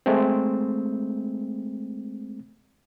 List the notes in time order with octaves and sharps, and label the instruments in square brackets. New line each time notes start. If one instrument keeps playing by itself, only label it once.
[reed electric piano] G#3 A3 C4